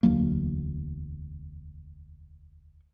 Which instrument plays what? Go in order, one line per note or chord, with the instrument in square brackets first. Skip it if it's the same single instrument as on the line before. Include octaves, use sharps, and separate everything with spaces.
[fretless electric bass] E1 D2 F#3 A#3